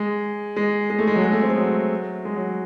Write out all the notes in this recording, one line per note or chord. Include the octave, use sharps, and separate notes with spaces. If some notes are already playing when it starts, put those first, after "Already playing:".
Already playing: G#3
G#3
G#3
A3
G#3
F#3
G#3
A3
C4
G#3
F#3
G#3
F#3